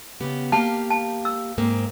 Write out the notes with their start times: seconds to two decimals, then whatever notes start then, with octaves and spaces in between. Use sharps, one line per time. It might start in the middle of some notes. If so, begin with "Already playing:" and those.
0.21 C#3 B3 G4
0.52 A#3 G4 F5 A5
0.91 A5
1.25 E6
1.58 G#2 A#3 C4